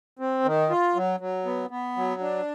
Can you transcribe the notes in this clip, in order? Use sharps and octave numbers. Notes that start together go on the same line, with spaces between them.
C4
D#3
F4
F#3
F#3
B3
B3
F#3
D4